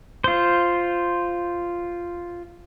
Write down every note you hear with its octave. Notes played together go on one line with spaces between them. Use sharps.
F4 C5